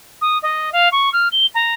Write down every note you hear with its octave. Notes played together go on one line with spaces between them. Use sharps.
D#6
D#5
F5
C#6
F6
G7
A#5